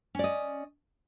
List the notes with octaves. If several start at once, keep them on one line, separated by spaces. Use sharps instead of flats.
C#4 D5 D#5